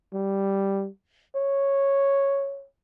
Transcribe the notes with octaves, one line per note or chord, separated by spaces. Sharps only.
G3
C#5